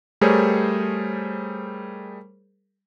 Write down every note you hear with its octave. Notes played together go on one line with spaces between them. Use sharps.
G3 A3 G#4 A#4 C5 C#5